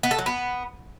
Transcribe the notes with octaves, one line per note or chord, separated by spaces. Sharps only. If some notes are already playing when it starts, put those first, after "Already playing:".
B3
A4
F#3
B3